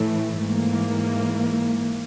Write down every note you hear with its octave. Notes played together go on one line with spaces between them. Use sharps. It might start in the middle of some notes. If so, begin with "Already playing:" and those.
Already playing: A2 E3 A3
G#2 E3 A#3